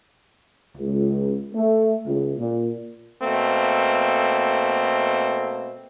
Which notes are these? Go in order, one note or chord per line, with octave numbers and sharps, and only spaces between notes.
C#2
A3
C#2
A#2
B2 A3 A#3 C4